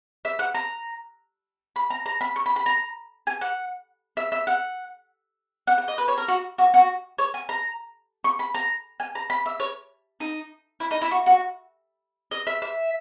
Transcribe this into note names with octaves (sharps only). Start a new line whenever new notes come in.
E5
F#5
A#5
B5
A#5
A#5
B5
C#6
B5
B5
A#5
G#5
F#5
E5
E5
F#5
F#5
F#5
D#5
B4
C#5
A#4
F#4
F#4
F#4
C#5
G#5
A#5
C#6
B5
A#5
G#5
A#5
B5
E5
C#5
D#4
E4
D#4
E4
F#4
F#4
D#5
E5
E5